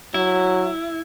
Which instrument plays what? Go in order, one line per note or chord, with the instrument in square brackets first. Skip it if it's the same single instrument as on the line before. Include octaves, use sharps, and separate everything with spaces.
[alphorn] F#3 [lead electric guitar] E4